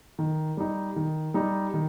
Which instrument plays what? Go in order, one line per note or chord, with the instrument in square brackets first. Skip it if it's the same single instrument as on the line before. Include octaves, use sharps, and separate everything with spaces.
[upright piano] D#3
G3 D#4
D#3
G3 D#4
D#3